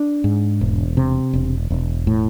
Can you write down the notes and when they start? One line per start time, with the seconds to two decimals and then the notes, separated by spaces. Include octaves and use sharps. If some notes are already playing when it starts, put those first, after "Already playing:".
Already playing: D4
0.24 G#2
0.61 E1
0.97 C3
1.33 E1
1.70 E1
2.07 A2